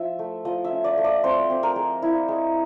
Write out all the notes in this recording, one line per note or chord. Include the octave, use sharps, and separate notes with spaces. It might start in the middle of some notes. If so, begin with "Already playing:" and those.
Already playing: F3 E5
A3
F3 D#5
E5
C#4
D5
A3
D5
C4 C5
C4
A#4
G#3
E4
G#3